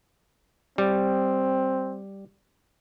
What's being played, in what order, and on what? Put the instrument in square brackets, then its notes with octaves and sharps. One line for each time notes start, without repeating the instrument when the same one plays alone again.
[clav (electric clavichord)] G3 [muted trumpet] C4